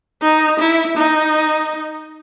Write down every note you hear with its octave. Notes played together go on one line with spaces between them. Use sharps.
D#4
E4
D#4